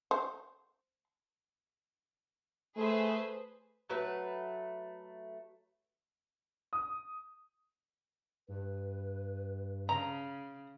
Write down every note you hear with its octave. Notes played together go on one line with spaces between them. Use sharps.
C5
A3 G#4 B4 C5
F#3 A3 B4
D#6
G2 B4
C#3 A#5